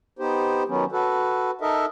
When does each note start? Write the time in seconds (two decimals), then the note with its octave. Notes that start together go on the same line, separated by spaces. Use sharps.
0.19 B3 D#4 G4 C5
0.68 D#3 F#3 B3 C#4
0.92 F#4 A4 B4
1.61 D#4 A4 A#4 D#5 E5